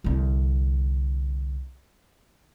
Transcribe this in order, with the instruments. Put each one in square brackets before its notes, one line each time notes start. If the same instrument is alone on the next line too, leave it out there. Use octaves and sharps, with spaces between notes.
[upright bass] C2 D3